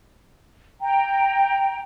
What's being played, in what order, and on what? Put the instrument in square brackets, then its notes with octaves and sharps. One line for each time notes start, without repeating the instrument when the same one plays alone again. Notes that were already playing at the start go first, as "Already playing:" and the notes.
[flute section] G5 A#5